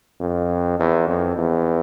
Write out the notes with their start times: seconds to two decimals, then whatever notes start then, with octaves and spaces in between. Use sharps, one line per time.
0.20 F2
0.79 E2
1.08 F2
1.37 E2